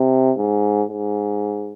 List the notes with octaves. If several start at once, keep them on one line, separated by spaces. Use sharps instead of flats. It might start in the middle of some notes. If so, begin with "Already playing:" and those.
Already playing: C3
G#2
G#2